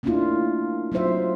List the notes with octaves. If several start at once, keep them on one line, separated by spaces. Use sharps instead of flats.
A3 A#3 C#4 D4 E4 F4
F#3 C4 D#4 F4 C5 E5